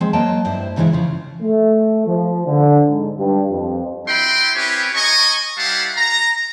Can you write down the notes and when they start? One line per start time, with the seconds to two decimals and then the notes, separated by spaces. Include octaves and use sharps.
0.01 F3 G#3 C4
0.13 F#3 A#3 D#5 G5 A5
0.45 G2 E4 C5
0.76 G#2 C#3 E3 G#3 C#4 E4
0.93 C#3 F3
1.42 A3
2.07 F3
2.47 D3
2.87 G#2
3.17 G2
3.49 F2
4.08 E4 F#4 E5 G5 B5 C6
4.56 C4 C#4 E4 G4 B4 C#5
4.95 D#5 G#5 A#5 C#6
5.58 G3 E4 G4 F5 F#5 A5
5.97 A#5